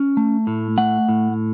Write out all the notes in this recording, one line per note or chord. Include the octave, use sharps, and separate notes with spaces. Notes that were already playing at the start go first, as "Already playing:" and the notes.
Already playing: C#4
A3
A2
A3 F#5
A2